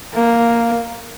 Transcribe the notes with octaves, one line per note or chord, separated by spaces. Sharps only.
A#3